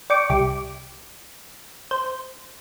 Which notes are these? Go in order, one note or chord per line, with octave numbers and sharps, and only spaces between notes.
D5 G5 C#6 D6
C2 G4 D6
C5